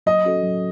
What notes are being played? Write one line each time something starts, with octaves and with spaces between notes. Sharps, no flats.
F#3 D#5
C#4 F#4 A4
F#3